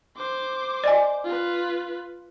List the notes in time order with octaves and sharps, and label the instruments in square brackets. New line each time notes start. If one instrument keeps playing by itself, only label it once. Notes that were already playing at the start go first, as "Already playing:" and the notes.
[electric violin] C5 D6
[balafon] D5 D#5 G#5
[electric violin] F4 B4